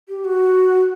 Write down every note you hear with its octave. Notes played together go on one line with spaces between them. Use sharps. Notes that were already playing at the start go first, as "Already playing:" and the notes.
G4
F#4